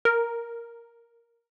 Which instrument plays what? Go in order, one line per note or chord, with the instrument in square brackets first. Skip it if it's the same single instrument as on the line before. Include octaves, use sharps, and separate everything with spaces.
[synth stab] A#4